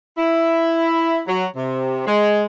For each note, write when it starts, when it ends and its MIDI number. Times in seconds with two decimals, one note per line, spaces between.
0.18 1.21 64
1.28 1.45 54
1.56 2.06 48
2.07 2.44 56